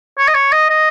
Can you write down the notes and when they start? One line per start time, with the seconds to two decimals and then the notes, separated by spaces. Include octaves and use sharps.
0.18 C#5
0.28 D#5
0.35 C#5
0.53 D#5
0.70 D#5